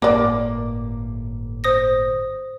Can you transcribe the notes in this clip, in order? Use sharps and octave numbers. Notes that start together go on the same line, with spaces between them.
G1 A2 A#3 A#4 D5 D6
C5 D#6 A#6